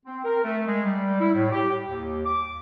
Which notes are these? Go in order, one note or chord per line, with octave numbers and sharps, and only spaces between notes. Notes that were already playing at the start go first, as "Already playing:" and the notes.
C4
A#4
A3
G#3
G3
E4
A2
G4
D#2
D6